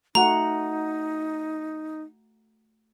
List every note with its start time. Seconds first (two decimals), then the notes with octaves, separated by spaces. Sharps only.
0.15 A3 D#4 F#4 F#5 A#5